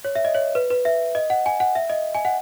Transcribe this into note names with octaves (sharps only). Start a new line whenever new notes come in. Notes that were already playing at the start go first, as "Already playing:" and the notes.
C#5
E5
D#5
C#5
B4
B4
E5
D#5
F#5
G#5
F#5
E5
D#5
G#5
F#5